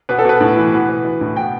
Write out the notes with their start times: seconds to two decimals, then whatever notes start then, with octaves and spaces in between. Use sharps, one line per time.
0.09 B2 B4
0.19 A4
0.25 B2 B4
0.41 A2
0.57 E3
0.73 B2
0.89 B2
1.05 E3
1.21 A2
1.36 B2 G5